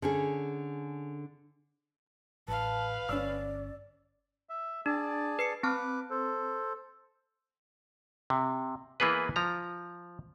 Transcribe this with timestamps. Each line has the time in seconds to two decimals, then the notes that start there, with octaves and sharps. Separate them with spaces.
0.02 D3 C#4 G#4
2.48 A1 B4 F5 A5
3.09 G1 C#4 D5 E6
4.49 E5
4.86 D4 G#4 D5 A5
5.39 B4 C7 C#7
5.63 C4 B4 A5 D6 F6
6.10 A4 C5
8.30 C3
9.00 E3 A#3 B3 G#4 B4
9.36 F3 A#5